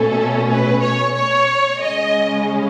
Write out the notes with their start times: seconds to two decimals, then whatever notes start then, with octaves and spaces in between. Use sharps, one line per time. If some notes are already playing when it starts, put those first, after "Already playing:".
Already playing: B2 A3 C#4 A4
0.50 B4
0.82 C#5
1.15 C#5
1.81 C#3 G#3 C#4 D#5